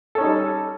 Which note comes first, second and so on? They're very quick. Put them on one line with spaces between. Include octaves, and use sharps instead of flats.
A4 C#4 D#4 G3